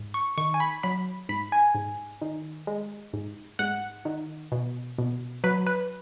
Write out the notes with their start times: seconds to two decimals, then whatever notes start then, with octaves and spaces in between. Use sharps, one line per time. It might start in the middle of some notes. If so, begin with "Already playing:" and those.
Already playing: G#2
0.14 C#6
0.38 D#3 C#6
0.54 G#5
0.60 B5
0.83 F#3 B5
1.29 G#2 B5
1.52 G#5
1.75 G#2
2.21 D#3
2.67 G#3
3.13 G#2
3.59 G#2 F#5
4.05 D#3
4.52 B2
4.98 B2
5.44 F#3 B4
5.66 B4